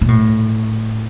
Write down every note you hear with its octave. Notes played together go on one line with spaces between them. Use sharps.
B2
A2